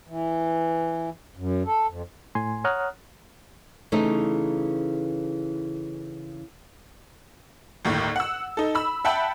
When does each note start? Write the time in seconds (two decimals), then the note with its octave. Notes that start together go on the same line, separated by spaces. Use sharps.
0.08 E3
1.37 F#2
1.66 A4
1.87 F2
2.35 A2 G#5 C6
2.64 C#5 F#5 A#5 D#6 F6 F#6
3.92 C#3 E3 A3 D#4
7.85 G1 D#2 A2
8.16 F#5 E6
8.57 D#4 A4
8.75 B5 E6
9.05 E5 F#5 G5 A5 B5